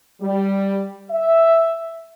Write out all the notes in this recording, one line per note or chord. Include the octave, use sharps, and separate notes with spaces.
G3
E5